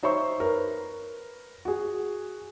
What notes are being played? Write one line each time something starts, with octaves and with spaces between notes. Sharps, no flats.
D#4 C5 C#5 E5 C#6
A#4 B4
F#4 G#4